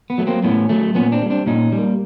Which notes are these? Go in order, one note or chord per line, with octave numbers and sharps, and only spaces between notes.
B3
F#3 A3
A#3 C4
A2 B3 C#4
F#3 A3
A#2 B3 C#4
C4 D4
G3 A#3
C4 D4
A#2 C#4 D#4
G3
A#3